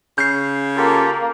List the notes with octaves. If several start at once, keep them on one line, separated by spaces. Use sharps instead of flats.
C#3 G6 C7
A#3 F4 G4 A4